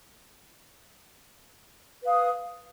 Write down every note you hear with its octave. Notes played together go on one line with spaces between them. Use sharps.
B4 F5 D#6